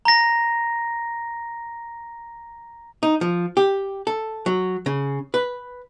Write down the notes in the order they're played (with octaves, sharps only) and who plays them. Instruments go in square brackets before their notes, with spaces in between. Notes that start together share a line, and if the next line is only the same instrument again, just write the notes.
[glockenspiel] A#5 A#6
[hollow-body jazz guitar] D#4
F3
G4
A4
F#3
C#3
B4